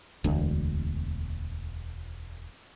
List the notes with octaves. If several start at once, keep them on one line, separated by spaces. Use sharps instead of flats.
E1 D2